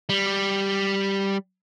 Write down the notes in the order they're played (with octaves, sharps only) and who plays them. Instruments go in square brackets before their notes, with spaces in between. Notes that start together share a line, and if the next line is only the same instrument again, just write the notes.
[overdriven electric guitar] G3